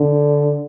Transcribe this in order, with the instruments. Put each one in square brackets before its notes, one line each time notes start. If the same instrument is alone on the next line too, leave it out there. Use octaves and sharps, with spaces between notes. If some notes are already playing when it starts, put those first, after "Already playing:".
Already playing: [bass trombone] D3